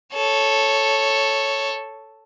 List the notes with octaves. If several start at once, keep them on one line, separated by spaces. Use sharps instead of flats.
A4 C#5